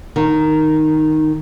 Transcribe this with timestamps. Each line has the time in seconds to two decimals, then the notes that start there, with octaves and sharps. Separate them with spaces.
0.16 D#3